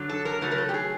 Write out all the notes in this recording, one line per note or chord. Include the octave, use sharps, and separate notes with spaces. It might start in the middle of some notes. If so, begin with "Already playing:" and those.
Already playing: F#2 D3 F#3
A4
A#4
C#3 F#3 A3 A#4
A#4
A4
G4
G#4